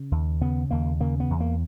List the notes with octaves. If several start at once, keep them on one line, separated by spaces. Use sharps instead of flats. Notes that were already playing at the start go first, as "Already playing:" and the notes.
Already playing: C#3
D#2
C#3 B3
D#2 A#3
C#3 A#3
B3
E2
A#3